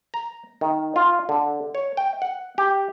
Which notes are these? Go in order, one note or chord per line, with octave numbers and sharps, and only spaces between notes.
A#5
D#3
F4
D3
C#5
G5
F#5
G4